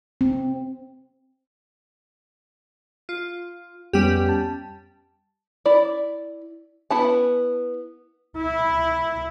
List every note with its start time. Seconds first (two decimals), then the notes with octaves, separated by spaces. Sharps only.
0.21 C4
3.09 F4
3.93 F2 G3 B3 C#4 G4
4.29 A5
5.66 E4 D5
6.90 B3 E4 A5
8.37 E4